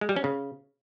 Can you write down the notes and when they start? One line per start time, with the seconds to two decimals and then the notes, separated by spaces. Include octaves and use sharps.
0.01 G#3
0.09 G3
0.16 C#4
0.24 C#3